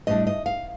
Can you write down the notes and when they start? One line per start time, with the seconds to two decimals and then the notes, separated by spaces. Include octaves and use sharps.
0.07 A2 G3 D4 D#5
0.27 D#5
0.46 F5